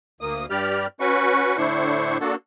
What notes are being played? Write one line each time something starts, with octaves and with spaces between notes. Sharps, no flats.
D2 A#3 D#6
G2 G3 G4 D5 F6
C#4 F#4 B4 C#6
A2 D3 D4 E4 C5 C#6
A#3 D4 F#4 A4